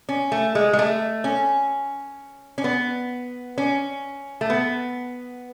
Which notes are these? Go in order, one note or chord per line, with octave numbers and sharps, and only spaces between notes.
C#4
A3
G#3
G#3
A3
C#4
C#4
B3
C#4
A3
B3